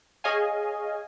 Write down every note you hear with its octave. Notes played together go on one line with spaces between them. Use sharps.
G#4 C#5 D#5 F5 G#5